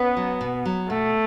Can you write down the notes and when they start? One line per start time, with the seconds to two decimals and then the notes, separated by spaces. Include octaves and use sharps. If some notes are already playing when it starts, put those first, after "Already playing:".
Already playing: B3 C#4 B4
0.17 F#3
0.41 B2
0.65 F#3
0.89 B2 A3